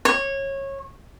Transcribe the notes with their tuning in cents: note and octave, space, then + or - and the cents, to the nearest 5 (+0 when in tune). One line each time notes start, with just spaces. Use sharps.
C#5 -20